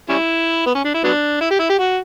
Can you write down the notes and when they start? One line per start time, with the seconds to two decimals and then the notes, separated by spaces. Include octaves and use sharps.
0.09 G3 C#4 E4
0.66 B3
0.75 C#4
0.84 D4
0.94 E4
1.04 F#3 B3 D4
1.41 E4
1.50 G4
1.59 E4
1.69 G4
1.78 F#4